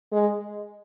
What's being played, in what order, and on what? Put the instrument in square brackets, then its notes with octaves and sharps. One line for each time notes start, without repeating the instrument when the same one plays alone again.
[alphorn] G#3